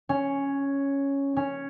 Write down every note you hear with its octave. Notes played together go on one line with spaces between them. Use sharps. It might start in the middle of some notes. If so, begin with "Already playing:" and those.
C#4
C#4